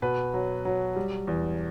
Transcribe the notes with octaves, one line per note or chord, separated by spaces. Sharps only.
B2 B4
F#3
F#3
G3
E2